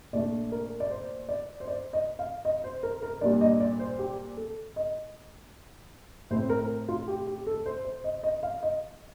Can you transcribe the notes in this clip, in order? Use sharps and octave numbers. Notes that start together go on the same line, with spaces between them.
A#2 A3 D4 D5
A#4
D5
C5
D5
C5
D5
D#5
F5
D#5
C5
A#4
A#4
A#2 G3 A#3 D4 D5
D#5
D5
C5
G4
A4
D#5
A2 A3 C4 C5
A#4
F4
G4
G4
A4
C5
C5
D#5
D#5
F5
D#5